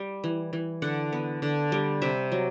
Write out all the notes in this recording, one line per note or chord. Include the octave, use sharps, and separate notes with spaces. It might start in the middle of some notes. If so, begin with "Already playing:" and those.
Already playing: G3
E3
E3
D3 F#5
B3
D3
G3
C3 E5
F#3